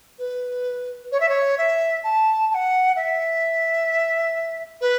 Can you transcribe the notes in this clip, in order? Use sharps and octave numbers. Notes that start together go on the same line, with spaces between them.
B4
C#5
E5
C#5
E5
A5
A5
F#5
E5
B4